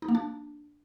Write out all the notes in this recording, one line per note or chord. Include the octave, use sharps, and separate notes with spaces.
D#4
A#3
D4